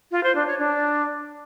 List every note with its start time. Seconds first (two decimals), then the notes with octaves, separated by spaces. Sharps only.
0.12 F4
0.23 C5
0.35 D4
0.47 C#5
0.59 D4